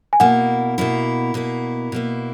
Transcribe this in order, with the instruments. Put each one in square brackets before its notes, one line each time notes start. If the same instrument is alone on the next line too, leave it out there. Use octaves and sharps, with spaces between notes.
[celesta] G#5
[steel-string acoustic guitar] B2 A#3 E4 [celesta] F#5
[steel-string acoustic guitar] B2 A#3 E4
B2 A#3 E4
B2 A#3 E4